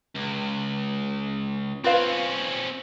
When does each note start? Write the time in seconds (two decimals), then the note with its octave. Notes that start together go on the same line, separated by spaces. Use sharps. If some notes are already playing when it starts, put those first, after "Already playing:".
0.15 C#2
1.84 C4 C#4 F4 B4 F5